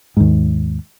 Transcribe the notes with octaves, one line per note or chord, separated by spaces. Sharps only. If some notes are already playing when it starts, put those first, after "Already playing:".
D#2 G#2